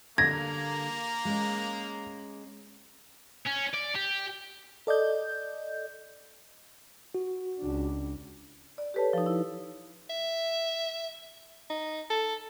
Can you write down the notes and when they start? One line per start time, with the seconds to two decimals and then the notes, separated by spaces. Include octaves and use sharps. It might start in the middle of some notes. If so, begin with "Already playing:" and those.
0.18 D3 G3 A#3 A#5 G#6 A#6
1.25 G#3 C#4
3.46 C#4
3.74 D5
3.95 G4
4.87 A4 D5 D#5 G6
7.15 F#4
7.58 C#2 D4
8.78 D5
8.94 G4 A4 B4 C#5 A5
9.13 F3 D#4
9.26 E4
10.10 E5
11.70 D#4
12.10 A4